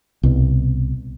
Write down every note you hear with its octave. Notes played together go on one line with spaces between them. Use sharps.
C2 B2